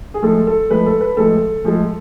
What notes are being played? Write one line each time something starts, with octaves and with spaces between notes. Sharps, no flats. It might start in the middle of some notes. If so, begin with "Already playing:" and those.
G#4
A2 F3 G#3 A4
A4
A2 F3 G#3 B4
A4
B4
A2 F3 G#3 A4
A2 F3 G#3